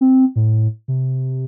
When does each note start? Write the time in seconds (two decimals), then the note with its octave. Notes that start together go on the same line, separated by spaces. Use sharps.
0.01 C4
0.36 A2
0.88 C3